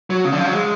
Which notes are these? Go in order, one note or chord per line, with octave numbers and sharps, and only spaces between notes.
F#3
C#3
D3
F3
F#3
G#3